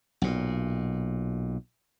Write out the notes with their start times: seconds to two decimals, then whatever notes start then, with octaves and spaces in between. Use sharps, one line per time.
0.22 B1 A#2